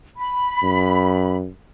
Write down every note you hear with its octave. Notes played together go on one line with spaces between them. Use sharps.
B5
F#2